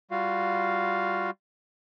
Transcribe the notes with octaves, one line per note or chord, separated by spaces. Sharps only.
G3 F4 F#4 F5